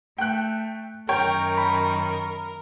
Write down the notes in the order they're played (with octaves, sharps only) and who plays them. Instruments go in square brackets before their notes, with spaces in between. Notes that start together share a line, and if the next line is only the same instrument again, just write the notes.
[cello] A3 [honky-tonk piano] G5 F#6
[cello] F#2 D#3 [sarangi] A#4 [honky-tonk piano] C#5 G5
[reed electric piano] B5